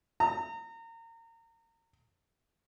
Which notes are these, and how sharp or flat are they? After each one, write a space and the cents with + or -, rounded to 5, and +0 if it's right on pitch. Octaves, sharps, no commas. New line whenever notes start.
A#5 -30